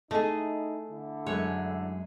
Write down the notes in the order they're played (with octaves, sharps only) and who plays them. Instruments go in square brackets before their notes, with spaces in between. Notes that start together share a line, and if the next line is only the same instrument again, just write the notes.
[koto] A3 [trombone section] D#4 E4 [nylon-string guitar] G#4 D#5
[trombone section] D3 E4
[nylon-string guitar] F#2 G#3 [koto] C#5